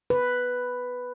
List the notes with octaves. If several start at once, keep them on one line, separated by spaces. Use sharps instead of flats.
B4